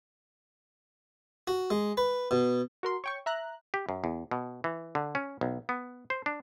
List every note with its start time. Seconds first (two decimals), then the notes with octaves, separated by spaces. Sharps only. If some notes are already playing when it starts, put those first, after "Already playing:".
1.47 F#4
1.71 G#3
1.97 B4
2.31 B2
2.83 F#4 A#4 C6
3.04 C#5 G5 C#6
3.26 E5 A#5 F#6
3.74 G4
3.89 F#2
4.04 E2
4.31 B2
4.64 E3
4.95 D3
5.15 C#4
5.41 B1
5.69 B3
6.10 C5
6.26 D4